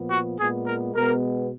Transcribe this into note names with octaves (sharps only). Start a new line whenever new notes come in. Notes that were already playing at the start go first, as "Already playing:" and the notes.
Already playing: A#2 F3 B3
F#4
A#2 G#3 B3 G#4
A#4
B2 G#3 B3 A#4